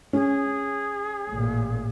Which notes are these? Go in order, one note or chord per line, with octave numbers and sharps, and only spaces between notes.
C#4 G#4
A1 A#2